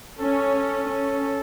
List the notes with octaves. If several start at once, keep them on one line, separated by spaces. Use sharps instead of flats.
C#4 A4
C#4